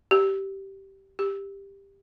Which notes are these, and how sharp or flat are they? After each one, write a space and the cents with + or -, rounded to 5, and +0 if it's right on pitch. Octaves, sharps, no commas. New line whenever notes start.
G4 -15
G4 +10